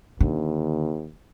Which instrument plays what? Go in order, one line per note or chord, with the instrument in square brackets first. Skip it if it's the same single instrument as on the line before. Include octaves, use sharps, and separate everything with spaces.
[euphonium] D#2 [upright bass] D3